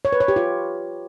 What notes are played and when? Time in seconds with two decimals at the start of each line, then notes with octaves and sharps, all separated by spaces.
0.05 C#5
0.13 B4
0.20 C#5
0.28 G4
0.36 F4